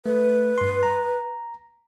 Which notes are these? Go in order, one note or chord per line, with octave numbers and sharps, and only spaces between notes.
A3 B4
G2 C6
A#5